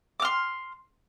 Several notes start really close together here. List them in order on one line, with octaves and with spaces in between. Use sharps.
D6 F6 C6